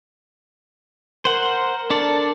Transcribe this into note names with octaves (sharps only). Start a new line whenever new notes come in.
A#4 C5 F#5
D4 A4 D5